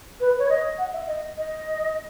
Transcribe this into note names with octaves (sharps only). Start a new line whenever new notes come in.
B4
C#5
D#5
F#5
E5
D#5
D#5